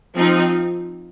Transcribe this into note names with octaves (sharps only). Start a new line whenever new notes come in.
F3 C4 D#4